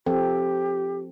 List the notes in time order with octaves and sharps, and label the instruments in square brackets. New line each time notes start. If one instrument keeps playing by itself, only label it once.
[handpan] F3 C4 A4 [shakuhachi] G4